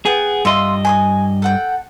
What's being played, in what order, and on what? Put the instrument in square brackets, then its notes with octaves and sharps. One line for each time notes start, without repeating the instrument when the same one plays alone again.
[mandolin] B3 G5 [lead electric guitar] G#4
[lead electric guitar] G2 D#5 [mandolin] F4 E5 C6
[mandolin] G#5 C6 D#6
A4 F#5 G5